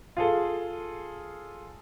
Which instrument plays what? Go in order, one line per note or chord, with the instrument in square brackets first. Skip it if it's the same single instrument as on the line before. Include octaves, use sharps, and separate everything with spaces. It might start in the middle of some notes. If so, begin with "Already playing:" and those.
[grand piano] F4 G#4 A4